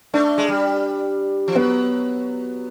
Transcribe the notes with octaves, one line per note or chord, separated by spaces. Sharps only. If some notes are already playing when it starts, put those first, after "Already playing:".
A3 D4
G#3
G3
F3
F#3 B3